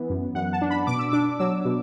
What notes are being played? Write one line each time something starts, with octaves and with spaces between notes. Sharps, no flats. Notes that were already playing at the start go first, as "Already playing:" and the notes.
Already playing: E3 B3
F#2
F#2 F#5
A5
D4
B5
B2 D6
E6
D4 D6
F#3 E6
B2